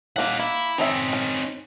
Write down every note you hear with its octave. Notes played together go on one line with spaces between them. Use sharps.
F#3 A#3 C#4 D#4 F#5
A#3 E4
D#3 C4 C#4 D#4 E5
C#4